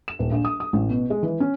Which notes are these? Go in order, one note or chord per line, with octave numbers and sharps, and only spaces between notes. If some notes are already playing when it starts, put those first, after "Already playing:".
E7
D#1
A#1
D#6
D#6
A1
B2
G#3
E3
C#4